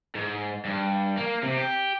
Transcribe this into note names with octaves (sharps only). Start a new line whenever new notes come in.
G#2
G2
A#3
C3
G4